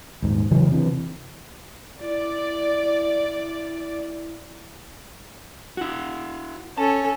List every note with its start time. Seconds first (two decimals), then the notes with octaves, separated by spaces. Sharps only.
0.22 D#1 G#2
0.51 F1 C#3 E3 F#3
0.71 C3 E3
2.03 E4 D5
5.77 E4 F#4
6.78 C#4 A4 A5